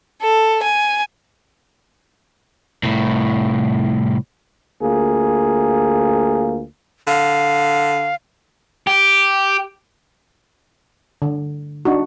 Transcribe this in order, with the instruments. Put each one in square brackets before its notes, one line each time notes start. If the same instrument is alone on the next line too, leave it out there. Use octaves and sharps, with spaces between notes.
[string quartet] A4
G#5
[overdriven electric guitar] C2 A2
[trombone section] D2 A#3 F4 G#4
[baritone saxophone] D3 [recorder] F5
[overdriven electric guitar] G4
[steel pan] D3
D4 D#4 F#4